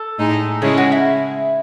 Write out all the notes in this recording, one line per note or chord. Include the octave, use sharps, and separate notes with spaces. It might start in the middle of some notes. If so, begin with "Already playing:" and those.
Already playing: A4
A2 G#3 D#4
C#3 G#3 C#4 E4 G#4
F#4
E4